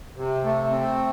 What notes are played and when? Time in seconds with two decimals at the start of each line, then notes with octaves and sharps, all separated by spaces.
0.16 C3
0.44 A3
0.71 C4